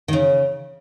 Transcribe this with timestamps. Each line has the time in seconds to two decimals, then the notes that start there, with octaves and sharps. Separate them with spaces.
0.08 D#3
0.13 C#3